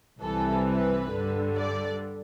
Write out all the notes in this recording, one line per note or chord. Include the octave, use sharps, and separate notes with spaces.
C2 C3 E3 G3 A4
B4
G2 D3 G3
D5